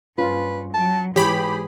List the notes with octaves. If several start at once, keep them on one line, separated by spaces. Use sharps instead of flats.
G2 C#4 F4 B4
F#3 A5
G#2 E3 G4 G#4 C#5 B5